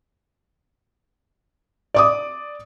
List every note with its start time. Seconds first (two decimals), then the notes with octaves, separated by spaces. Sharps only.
1.94 D5 D6 D#6